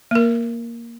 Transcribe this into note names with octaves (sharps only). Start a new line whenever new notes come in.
A#3 A#4